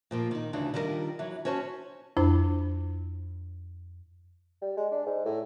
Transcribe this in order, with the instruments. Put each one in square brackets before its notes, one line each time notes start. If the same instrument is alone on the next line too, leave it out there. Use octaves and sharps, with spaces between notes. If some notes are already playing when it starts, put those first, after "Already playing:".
[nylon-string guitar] A#2 F3 A#3
D#3 D#4
D2 C#3 E3 D4
D#3 G3 D4 E4 F4 A#4
E3 F#3
C#4 F#4 C5 C#5 A5
[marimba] F2 D4 E4 C5 B5
[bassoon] G3
G#3
D4
G#2
A2